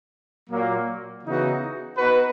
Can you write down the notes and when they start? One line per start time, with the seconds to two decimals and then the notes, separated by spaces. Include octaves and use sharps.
0.50 A#2 F#3 A#3
1.24 C#3 E3 B3 D#4 F#4
1.97 B3 D#4 F#4 B4